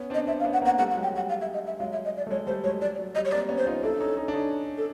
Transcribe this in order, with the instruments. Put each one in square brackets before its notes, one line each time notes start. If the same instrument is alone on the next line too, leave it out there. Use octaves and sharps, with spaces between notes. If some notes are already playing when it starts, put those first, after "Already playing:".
Already playing: [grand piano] B3 C#4
C4 D4
[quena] D#5
[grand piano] C4 D4 [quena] E5
[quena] F5
[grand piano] B3 C#4
[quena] F#5
[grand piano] A#3 C4
[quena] F#5
[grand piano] G3 A3 [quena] F#5
[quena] F#5
[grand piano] F#3 G#3
[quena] G5
[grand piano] G3 [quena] F#5
[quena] F5
E5
D#5
E5
[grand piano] F#3 G#3 [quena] F5
[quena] E5
D#5
D5
[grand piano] A3
[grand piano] F#3 G#3 [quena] C#5
[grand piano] G3 A3 [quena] C5
[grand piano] F#3 G#3 [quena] C#5
[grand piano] F#3 [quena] D5
[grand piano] F#3
[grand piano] G3 [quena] D#5
[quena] C#5
[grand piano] A#3 C4 [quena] D5
[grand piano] B3 C#4
[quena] C5
[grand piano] D#4 F4
[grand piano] D4 E4 [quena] A4
[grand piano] C#4 D#4
C#4 D#4
D4
C#4 D#4
[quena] A4